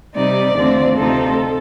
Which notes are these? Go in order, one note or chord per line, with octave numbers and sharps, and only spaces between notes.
C3 G3 C4 D#4 D5
D#2 D3 F3 A3 C4
D2 C3 F3 C4 D#4 A4